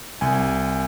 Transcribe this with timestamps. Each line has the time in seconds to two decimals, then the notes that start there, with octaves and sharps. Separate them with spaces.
0.21 C2 G#5